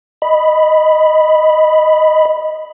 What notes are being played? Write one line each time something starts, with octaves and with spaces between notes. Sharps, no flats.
D#5 B5